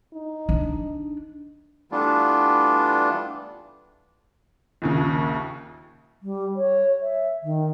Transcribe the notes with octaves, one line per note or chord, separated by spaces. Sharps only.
D#4
D4
E3 G3 A3 B3 D4 F4
A#1 D#2 C#3
G3
C#5
E5
D#3